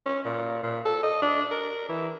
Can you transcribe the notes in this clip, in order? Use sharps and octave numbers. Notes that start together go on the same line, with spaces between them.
C#4
A#2
A#2
A4
D#5
D4
A#4
E3